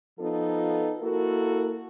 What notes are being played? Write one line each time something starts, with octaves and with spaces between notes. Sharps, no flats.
F3 B3 D#4 F4 A4
A#3 E4 F#4 A4 A#4